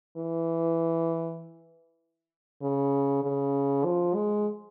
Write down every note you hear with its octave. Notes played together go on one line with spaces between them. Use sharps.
E3
C#3
C#3
F3
G#3